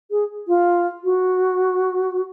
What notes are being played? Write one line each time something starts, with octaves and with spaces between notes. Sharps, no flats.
G#4
F4
F#4